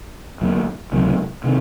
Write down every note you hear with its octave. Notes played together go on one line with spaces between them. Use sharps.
F2 D3 F#3 A#3
C#2 C3 D#3 F#3
C3 D#3